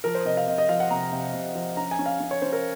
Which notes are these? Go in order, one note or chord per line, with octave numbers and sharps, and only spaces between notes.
F3 A#4
C5
C3 D#5
F5
C3 D#5
D#5
F3 F5
F#5
C3 A#5
C3
C3
F3
C#4 A#5
G#5
C#4
F5
C#4
C#5
C#4 C5
A#4